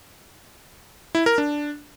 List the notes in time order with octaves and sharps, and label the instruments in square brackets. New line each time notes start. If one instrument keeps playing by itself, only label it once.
[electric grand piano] E4
A#4
D4